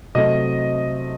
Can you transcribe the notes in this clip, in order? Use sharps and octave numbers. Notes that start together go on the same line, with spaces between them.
C3 F#3 A3 C4 D#5